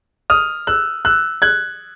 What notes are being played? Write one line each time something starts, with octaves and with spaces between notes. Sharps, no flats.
D#6 F6
E6 F#6
E6 F#6
F#6 G#6